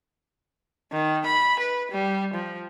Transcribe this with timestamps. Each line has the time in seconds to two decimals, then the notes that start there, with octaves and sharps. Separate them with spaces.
0.92 D#3
1.26 B5
1.60 B4
1.92 G3
2.34 F3